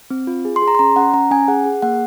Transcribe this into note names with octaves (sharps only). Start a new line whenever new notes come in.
C4
F4
G#4
C6
G#4
A#5
C6
C#4 A#5
C#4 F#5
C#4 A#5
C#4 G#5
G#4 F#5
G#4
A#3 F#5